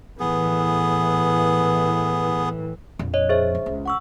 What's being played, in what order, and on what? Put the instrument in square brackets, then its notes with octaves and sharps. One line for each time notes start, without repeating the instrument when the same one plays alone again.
[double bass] A2 E3 [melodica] B3 G#4
[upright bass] A#1 F2
[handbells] C#5 D#5
G#4 C5 E5
[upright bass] D3
C#2
[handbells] F#5 C#6 E6